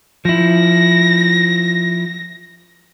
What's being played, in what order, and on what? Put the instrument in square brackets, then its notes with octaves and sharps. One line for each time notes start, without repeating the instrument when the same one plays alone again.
[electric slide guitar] F3 E4 [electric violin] A#6